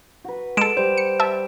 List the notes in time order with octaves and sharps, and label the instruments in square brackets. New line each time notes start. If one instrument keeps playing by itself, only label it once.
[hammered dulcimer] F#4 B4
[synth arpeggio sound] G#3 A4 [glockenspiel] D7 E7
[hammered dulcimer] G3 [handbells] C5
[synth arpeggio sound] C#7
E5 A5